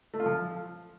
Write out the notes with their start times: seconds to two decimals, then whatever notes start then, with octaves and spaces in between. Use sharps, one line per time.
0.14 A3
0.20 F4
0.26 F3